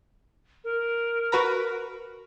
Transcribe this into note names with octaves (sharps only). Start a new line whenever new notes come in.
A#4
F#4 B4 A#5